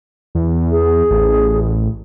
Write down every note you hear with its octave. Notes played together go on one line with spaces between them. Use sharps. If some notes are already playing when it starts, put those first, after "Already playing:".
E2
G#4
A1